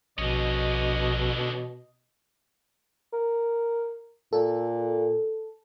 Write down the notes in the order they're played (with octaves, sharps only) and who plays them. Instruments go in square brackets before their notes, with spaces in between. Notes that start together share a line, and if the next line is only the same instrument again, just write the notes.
[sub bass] A#1 [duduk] B2 [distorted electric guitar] D3 C#4 [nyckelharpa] D#5
[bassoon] A#4
[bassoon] A#2 [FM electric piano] A4